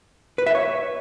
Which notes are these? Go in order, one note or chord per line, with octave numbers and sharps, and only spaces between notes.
B4
E5
C#5